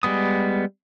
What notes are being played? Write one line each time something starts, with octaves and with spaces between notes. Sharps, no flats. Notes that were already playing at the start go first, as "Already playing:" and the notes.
G3 G#3 B3 D#6